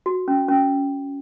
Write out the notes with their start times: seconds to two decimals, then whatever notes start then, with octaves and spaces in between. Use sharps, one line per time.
0.06 F#4
0.28 C#4
0.49 C#4